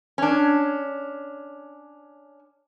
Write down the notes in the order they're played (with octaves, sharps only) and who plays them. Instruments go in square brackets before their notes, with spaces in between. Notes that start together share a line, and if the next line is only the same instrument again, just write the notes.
[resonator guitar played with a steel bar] C#4 D4